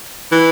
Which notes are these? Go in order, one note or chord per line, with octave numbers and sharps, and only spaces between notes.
E3